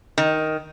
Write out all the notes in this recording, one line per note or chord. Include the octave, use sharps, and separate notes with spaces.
D#3